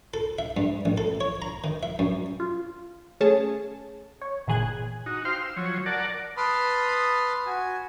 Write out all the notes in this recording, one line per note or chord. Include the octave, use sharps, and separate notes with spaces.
A4
E5
G2
A1
A4
C#5
A#5
D#3
E5
F#2
F4
A3 C#4 G#4 C#5 A5
C#5
G1 A#2 E3 G#4 F#6 G#6
D#4 F#4
C5 F5 G5 C6 F6
E6
F3 F#3 C#5
A#4 D5 F#5 A5
B4 A5 B5 C6 D#6 F6
F#4 G#5